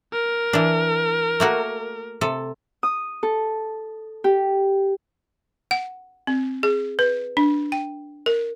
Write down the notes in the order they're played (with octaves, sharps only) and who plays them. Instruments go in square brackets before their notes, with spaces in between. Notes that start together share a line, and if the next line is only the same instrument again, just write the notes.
[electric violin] A#4
[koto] E3 D4
A3 A#3 F#4
C3 A4
[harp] D#6
A4
G4
[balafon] F#5
C4
G#4
B4
D4
G5
A#4